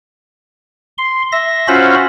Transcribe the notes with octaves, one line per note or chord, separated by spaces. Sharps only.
C6
E5 A#6
C#4 F4 F#4 C5 B5